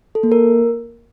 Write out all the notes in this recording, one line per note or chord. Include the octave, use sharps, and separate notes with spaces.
A4
A#3
A#4